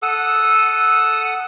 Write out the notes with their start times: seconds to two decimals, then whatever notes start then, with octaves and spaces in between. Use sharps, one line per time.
0.02 A4 F#5 D#6 E6